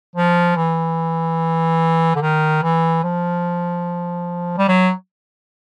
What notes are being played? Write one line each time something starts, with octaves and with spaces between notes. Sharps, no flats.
F3
E3
D3
D#3
E3
F3
G3
F#3